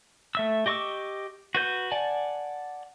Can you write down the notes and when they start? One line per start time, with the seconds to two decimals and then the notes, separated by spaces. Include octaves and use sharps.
0.35 A3 E5 E6
0.66 G4 D#5 C#6 D6 E6
1.55 F#4 B4 G6
1.92 D5 F#5 G#5 A5